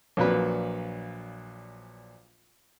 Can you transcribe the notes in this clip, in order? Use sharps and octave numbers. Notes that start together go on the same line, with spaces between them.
A#1 A#2 F#3 B4